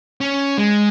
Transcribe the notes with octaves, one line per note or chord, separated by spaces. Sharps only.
C#4
G#3